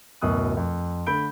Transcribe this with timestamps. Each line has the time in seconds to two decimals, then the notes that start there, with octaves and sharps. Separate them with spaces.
0.22 D1 F#2 B2 D#6 F#6
0.57 F2
1.06 D3 A3 B5 G6 D7